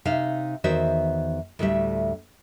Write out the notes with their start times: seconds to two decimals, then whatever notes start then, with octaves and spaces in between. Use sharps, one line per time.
0.05 C3 D#4 E5 F5
0.64 E2 D#3 F#4 C5 E5
1.59 D2 A2 G3 E5